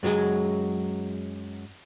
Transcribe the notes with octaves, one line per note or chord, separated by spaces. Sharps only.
F#2 F#3 G#3 G#4